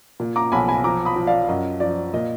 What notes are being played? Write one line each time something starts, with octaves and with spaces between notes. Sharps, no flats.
A#2
A#5 D6
B1 G#5 B5
G#5 B5
F3 A#5 D6
B5 D#6
F3
D5 F5
F#2 D#5
F3 D5
A#2 D#5